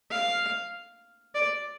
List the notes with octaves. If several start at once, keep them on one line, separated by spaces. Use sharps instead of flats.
F5
D5